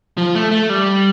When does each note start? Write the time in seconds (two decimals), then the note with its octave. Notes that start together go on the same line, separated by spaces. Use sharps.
0.17 F3
0.35 A3
0.51 A3
0.69 G3